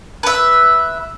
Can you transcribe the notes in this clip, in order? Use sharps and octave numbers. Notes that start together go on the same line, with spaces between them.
B4 E5